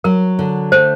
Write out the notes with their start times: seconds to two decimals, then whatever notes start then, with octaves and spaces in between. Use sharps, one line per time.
0.04 F#3 A#4
0.39 D3
0.72 A3 C5